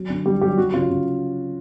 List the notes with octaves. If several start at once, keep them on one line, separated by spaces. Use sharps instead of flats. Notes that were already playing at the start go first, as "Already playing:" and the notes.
Already playing: F#3
D3
D3 G3 G4
F#3 G3 G4
F#3 F#4
C#3 F4
C#3